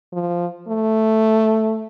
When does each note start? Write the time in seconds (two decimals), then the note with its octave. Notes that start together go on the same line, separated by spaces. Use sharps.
0.13 F3
0.69 A3